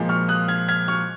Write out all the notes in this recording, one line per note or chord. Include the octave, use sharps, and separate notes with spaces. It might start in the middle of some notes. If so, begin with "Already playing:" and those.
Already playing: A#2 F3 G#3
C#6 F6
D#6 F#6
F6 G#6
F6 G#6
C#6 F6